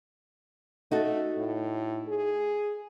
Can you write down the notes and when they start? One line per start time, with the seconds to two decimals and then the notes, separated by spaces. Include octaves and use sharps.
0.91 A3 D#4 F#4 A4
1.38 A2
2.08 G#4